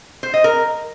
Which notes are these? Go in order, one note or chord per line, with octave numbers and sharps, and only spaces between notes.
C5
D#5
A#4